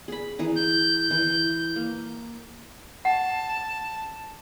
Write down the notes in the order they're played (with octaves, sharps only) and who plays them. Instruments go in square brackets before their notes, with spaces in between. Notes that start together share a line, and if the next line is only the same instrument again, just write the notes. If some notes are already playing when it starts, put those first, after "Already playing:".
[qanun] G#4 B5
E3 G#4 A#5
[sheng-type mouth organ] G6
[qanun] E3
A#3
[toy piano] F#5 [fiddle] A5